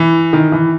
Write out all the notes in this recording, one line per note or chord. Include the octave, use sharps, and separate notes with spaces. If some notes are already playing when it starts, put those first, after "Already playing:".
Already playing: E3
D#3
E3